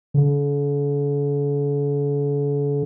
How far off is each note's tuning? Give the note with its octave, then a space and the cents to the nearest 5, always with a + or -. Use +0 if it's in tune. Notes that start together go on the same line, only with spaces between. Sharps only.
D3 -45